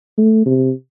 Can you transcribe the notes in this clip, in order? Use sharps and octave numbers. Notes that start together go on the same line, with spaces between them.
A3
C3